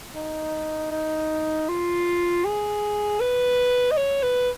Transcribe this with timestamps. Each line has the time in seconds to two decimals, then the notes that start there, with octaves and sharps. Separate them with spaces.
0.15 D#4
0.92 D#4
1.69 F4
2.45 G#4
3.20 B4
3.91 D#5
3.97 C#5
4.23 B4